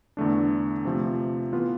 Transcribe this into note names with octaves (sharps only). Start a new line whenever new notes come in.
E2 D3 A3 D4
C3 F3 A3
E3 B3 F4 B4